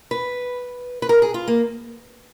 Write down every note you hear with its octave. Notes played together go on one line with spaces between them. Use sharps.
B4
B4
A#4
G#4
F4
A#3